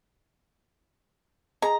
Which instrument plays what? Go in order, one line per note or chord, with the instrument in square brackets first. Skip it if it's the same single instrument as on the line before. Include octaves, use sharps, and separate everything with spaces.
[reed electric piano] G#4 D#5 [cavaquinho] A#5